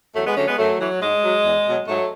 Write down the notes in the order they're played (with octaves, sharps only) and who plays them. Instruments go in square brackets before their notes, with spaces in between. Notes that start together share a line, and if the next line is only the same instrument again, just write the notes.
[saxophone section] E2 F#3 A3
G#3 B3
D3 F#3 A3 C#4
G#3 B3
F#2 F#3 A3
E3 F#3
G#2 G#3
F#3
E2
B2 F#3
G#2 F#3 A3